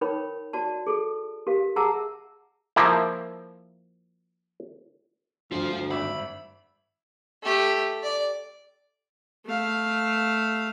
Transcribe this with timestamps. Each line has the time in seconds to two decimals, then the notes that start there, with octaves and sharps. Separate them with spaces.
0.01 D#4 A#4 C#5 G5 B5
0.53 F#4 D5 A5
0.87 G#4 A4
1.47 G4 A#4 F5
1.76 G#4 E5 F#5 A5 A#5 E6
2.76 F3 A#3 E4
5.52 D2 G2 G3 F4 C5
5.72 D2
5.91 G#1 E5 B5
7.43 A3 G4
8.03 D5
9.46 A3 F5